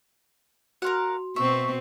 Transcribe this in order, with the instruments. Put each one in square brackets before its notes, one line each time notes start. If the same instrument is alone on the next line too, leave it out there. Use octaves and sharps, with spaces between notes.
[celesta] F#4 C6 [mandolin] A#4 F5 F#5
[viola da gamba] B2 B3 C4 [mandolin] E5 [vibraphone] C#6